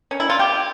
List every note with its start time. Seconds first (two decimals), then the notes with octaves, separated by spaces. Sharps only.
0.11 C#4
0.20 E4
0.30 F4
0.39 G4